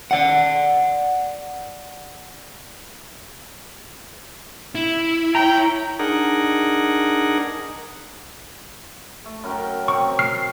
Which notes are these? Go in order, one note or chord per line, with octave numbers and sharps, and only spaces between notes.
D5 F#5
E4
C#5 G5 A#5
D4 D#4 G#4 A#4 F#5
A3
F#2 A#4 G5
C4 C#6
F6 C7